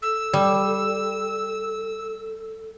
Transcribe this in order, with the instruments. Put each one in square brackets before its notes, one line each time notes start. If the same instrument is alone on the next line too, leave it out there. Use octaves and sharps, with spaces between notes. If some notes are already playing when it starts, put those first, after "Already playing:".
[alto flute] A4 [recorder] E6
[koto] G3